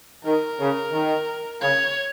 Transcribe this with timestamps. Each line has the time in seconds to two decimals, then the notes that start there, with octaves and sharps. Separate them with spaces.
0.24 D#3 A#4
0.59 C#3
0.93 D#3
1.61 C#3 C#5